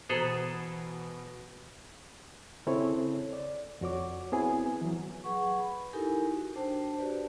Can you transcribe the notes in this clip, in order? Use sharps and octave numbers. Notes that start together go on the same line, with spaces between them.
B2 E3 B3 G#4 A4 C5 A#5
C#3 C4 E4 G#4 A4 C#5
D5
F2 F#4 C#5 D6
B3 C4 E4 G#4 G#5
E3 F#3
F#3 G#4 B4 F#5 C#6
B5
D#4 E4 G4 A4 A#4 G#5
F#4
D4 C5 G5 A5
F#4 G4 B4 D5